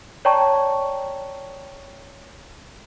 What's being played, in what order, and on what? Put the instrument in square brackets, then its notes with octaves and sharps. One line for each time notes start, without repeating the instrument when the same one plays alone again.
[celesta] C#5 D5 G5 A5 A#5 C#6